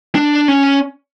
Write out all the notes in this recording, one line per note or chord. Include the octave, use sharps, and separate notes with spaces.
D4
C#4